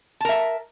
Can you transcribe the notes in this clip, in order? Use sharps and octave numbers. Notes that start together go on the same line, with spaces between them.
A#4 E5 A5